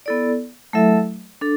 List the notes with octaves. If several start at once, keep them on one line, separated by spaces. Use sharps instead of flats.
B3 E4 A4 D5
F#3 A3 E4 A4 E5
D4 A4